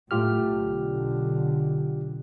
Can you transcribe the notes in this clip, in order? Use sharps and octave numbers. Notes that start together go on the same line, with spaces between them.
A2 F#3 A3 F4 G4 F6
B1 D3